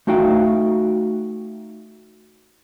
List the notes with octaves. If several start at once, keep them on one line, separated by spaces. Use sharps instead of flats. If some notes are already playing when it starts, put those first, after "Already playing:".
A3 D#4 F#4 F5 G5